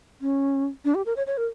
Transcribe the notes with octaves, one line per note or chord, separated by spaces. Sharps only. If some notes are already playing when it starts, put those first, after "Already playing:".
C#4
D4
G4
A#4
C#5
C#5
A#4